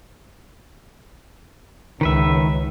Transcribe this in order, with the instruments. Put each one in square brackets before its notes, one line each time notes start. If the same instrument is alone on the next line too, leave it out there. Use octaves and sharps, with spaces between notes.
[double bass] C#2 [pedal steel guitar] D#3 B4 E5